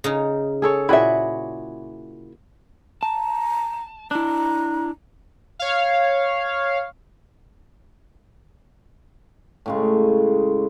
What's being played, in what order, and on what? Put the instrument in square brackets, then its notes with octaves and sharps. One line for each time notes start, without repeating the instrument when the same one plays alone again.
[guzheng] C#3 D#4
[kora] G#4 A4 C#5
[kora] A#2 F#4 G#4 [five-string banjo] E4 E5
[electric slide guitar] A5 [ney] A#5
[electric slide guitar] D4 E4 [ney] A#5
[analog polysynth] C#5 F5
[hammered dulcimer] A2 C#3 G#3